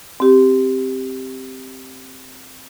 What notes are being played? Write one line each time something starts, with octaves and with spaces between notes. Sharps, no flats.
C4 G4